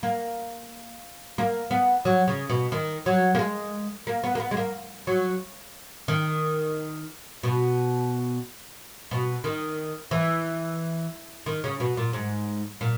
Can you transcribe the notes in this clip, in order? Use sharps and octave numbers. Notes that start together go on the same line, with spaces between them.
A#3
A#3
B3
F#3
C#3
B2
D#3
F#3
A#3
G#3
A#3
B3
A#3
B3
G#3
A#3
F#3
D#3
B2
B2
D#3
E3
D#3
C#3
B2
A#2
G#2
A#2